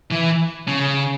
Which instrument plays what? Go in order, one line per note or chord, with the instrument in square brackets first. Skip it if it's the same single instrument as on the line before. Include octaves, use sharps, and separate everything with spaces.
[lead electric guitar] E3
C#3